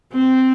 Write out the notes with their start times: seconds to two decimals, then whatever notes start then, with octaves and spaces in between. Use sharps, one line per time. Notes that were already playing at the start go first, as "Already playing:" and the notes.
0.14 C4